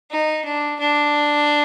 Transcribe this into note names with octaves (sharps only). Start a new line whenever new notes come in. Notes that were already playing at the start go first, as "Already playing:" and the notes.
D#4
D4
D4